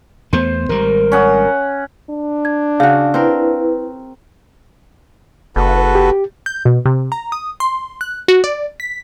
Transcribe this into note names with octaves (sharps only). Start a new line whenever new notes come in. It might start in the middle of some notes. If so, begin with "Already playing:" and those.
E2 A3 B3 C5
G#1 G3 A#4
C#4 F#5 D#6
D4
G#6
C#3 F#4 F5
C4 E4 A#4 B4
F#1 F#4 A4 B4
G4
G6
B2
C3
A#5
D#6
C6
F#6
F#4
D5
B6